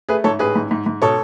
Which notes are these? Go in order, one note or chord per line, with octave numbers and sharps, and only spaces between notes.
A3 G#4 B4
G#2 A4 C#5
A1 G#4 B4
G#2
G#2
G#2
B2 A4 C#5